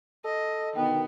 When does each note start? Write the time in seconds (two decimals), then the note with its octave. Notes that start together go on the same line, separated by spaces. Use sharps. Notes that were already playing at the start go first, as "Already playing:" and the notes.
0.25 A4 D#5
0.76 B2 D3 D#3 B3 G5